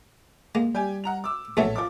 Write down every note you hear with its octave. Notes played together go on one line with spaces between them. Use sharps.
G#3 A#3
G3 G4 G#5
F#5 A#5 F7
D6 E6
A#1 E2 A2 F#3 A4 C#5 E5
F3 D6